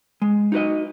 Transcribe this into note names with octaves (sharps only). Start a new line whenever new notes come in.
G#3
D#4 F#4 B4 D#5